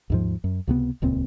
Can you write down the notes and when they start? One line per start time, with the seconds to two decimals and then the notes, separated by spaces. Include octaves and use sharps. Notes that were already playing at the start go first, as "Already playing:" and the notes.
0.10 D#2 G#2 F3
0.44 F#2
0.67 C#2 C3 B3
1.02 D#1 C#2 A#2 C4